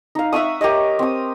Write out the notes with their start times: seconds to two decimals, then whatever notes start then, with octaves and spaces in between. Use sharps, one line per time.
0.15 D#4 F5
0.33 E5 F#5 C#6 D#6
0.61 G4 A#4 C#5 D#5
0.99 C4 D#6